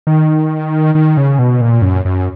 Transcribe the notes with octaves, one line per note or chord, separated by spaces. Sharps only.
D#3
D#3
C#3
B2
A#2
F#2
F#2